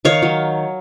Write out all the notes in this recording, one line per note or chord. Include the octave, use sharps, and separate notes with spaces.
D#3 C#5 F5
F#3